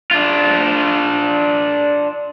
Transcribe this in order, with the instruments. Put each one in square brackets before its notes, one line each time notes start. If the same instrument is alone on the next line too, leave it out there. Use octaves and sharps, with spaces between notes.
[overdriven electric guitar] D4 F4